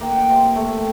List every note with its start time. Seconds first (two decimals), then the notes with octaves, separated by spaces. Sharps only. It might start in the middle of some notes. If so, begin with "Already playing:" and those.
0.01 A#3 G5
0.09 F#5
0.16 G5
0.29 C3
0.56 A3